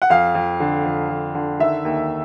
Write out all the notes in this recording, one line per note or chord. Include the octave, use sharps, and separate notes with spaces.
F#5
F2 F5
F2
D3
F2
F2
D3
D#3 E5
D#2